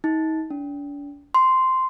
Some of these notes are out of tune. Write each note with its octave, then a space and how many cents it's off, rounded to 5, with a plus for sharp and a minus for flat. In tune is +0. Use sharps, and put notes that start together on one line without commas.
D#4 +35
D4 -40
C6 -5